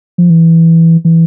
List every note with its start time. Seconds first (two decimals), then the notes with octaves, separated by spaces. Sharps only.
0.18 F3
0.30 E3
1.05 E3